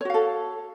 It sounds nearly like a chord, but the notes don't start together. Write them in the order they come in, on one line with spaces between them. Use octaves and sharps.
C#5 F#4 F5 A4